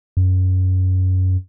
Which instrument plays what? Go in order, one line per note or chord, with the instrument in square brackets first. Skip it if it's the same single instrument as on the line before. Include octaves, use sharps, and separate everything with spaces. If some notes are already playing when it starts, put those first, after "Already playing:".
[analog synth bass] F#2